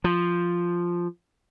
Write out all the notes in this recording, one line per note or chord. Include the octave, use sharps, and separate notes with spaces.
F3